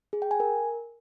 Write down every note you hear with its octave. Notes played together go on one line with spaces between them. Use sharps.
G#4
G5
G#5
A#4